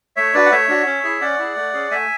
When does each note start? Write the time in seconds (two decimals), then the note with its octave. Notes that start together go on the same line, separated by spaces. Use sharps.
0.16 A3 C#5 E5
0.34 D4 F#4 B4 D5
0.46 F#5
0.51 A3 C#5 E5
0.69 D4 F#4
0.86 C#4
1.04 E4 G#4
1.21 C#4 D5 F#5
1.39 E4 G#4
1.56 A3
1.73 C#4 G#4
1.91 A3 E5 G#5